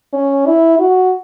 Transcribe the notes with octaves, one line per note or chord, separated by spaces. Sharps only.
C#4
E4
F#4